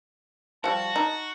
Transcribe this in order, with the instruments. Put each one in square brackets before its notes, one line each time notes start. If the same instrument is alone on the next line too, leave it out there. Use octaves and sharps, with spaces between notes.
[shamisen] F3 G3 [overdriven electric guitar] F#4 [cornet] A5
[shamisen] D#4